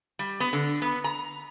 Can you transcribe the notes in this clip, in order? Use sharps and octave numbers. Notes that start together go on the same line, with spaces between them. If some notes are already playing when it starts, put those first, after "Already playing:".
G3
B3
D3
B3
A#5